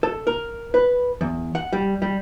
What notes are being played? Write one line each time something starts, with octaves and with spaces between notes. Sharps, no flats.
A4
A#4
B4
E2
F#5
G3
G3